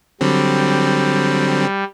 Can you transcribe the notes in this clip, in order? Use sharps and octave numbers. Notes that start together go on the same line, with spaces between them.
D3 F#3 G3 C4